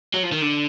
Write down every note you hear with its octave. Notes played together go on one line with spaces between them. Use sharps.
F#3
F3
D#3
D3